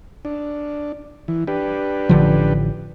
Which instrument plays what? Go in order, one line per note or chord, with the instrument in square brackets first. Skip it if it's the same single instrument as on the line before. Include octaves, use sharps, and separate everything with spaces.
[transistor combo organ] D4
E3
D4 G4 B4
[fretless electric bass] A1 D3 F3